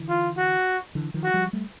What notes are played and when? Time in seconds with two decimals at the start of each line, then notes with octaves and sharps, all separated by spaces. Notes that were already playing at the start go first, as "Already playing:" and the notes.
Already playing: D3 E3
0.09 F4
0.37 F#4
0.95 D3 E3
1.14 D#3 F3
1.23 F#4
1.34 F3 G3
1.53 G3 A3